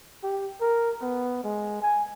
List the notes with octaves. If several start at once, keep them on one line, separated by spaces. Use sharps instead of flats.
G4
A#4
B3
G#3
G#5